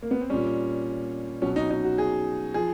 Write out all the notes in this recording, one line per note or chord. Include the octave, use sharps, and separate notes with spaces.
A#3
B3
C4
A#2 G3 C#4
B2 F#3 C#4
D#4
D#4
F#4
G#4
F3 G#4